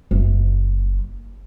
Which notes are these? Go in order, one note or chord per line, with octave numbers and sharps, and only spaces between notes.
F#1